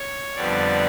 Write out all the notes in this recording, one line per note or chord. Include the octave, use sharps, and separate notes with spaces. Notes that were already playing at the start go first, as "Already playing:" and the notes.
Already playing: C#5
F2 D3 G3 B3 D5